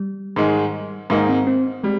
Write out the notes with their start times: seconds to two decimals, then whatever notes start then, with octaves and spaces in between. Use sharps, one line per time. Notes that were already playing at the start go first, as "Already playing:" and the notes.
Already playing: G3
0.36 G#2 D#3 G#3
1.10 G#2 D#3 G#3 A#3 D#4
1.29 C4
1.47 C4
1.84 G3 G#3